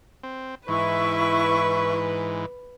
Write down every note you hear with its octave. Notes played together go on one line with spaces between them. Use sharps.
C4
G#2 E3 E4 B4 C#6